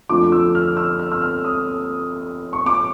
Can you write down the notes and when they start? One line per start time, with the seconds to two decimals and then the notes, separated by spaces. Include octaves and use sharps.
0.09 F2 D3 F3 A3 D6
0.32 E6
0.55 F6
0.77 E6
0.99 F6
1.12 E6
1.22 F6
1.45 D#6
2.53 C#6
2.66 D6